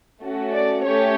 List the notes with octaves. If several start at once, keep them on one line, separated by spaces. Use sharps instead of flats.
A3 C#4 F#4 A4
D5
A3 C#4 G4 C#5